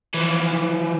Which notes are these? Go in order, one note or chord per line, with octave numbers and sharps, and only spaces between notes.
E3 F3